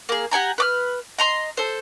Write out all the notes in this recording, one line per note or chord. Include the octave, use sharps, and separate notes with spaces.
A#3 G#4
G4 F#5 G#5 A#5
B4 D6 F6
D#5 A#5 C6
A4 C5